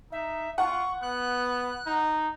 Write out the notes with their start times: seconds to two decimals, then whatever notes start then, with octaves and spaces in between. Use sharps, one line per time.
0.12 D#4 E5
0.58 F4 F#5 C#6
1.02 B3 F#6
1.86 D#4